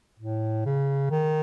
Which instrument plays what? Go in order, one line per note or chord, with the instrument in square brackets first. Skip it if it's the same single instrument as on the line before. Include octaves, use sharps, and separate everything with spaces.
[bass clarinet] A2
C#3
D#3